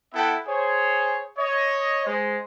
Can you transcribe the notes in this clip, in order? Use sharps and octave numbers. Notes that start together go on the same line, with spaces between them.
B3 E4 A4 E5 F#5 G5
G#4 C5 C#5
C#5 D#5
G#3 C5